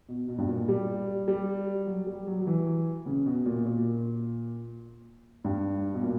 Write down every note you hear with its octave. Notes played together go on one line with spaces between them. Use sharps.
B2
B2
G2
A#2
G3
G3
F#3
G3
F#3
F#3
E3
C#3
B2
A#2
A#2
G2
B2
A#2